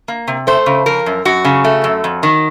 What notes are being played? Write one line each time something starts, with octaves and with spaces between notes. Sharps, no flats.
A#3
C3
A3 C5
C#3
F3 A#4
F#2
F#2 F#4
C#3
A3
F#2
F2
D#3